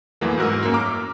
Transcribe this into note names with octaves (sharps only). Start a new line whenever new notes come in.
E2 E3 F#3 A3 A#3
G#2 F#4 A#4 E6
F#2 A#3
A#5 D6 F6